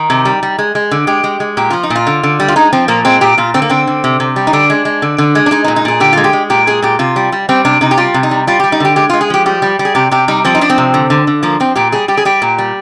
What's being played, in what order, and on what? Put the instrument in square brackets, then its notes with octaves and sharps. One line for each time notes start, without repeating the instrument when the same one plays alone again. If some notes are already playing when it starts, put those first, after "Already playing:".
Already playing: [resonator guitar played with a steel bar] D#3 D#4
C3
G3
G3
G#3
G#3
D3
G#3 G4
G#3
G#3
A#2 G4
F3 F4
D#4
A#2
F4
D3
D3
G3
F4
G#3 D#4
F3 C4
A#2 A#3
G#3 C4
A#2 G4
A#2 F4
D3 C4
A#3
D3 C4
D3
C3
C3
G3
D#4
D3 D4
G#3
G#3
D3
D3
G#3
D4
G#3 D#4
D#4
A#2
D#4
A#2 G#4
D3 G4
G#3 F4
G4
G#3
A#2 G4
G#3 G#4
A#2 G4
C3 F4
G3
G3
G3 C4
C3 D4
C3 D#4
G4
G3 F4
C3
D#4
G3
G3 F4
G4
G3
D#4
D3 G4
G#3 G4
F4
G#3
G#4
F3 G4
G3 G4
G3
G3
G#4
C3 G4
C3 G4
G3 D#4
F3 C4
D#4
F3 D4
C4
C3
D3
D3
D3
F3 A#3
F3 C4
A#2 G4
G3 G#4
G3 G4
G#4
G3 G4
A#2
G3